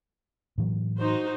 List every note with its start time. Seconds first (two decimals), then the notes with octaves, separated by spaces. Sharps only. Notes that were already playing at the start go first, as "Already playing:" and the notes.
0.58 A2 E3 F#3
0.98 D#4 F#4 C5